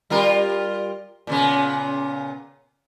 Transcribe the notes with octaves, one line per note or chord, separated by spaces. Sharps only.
G3 F4 A#4
A#2 C#3 B3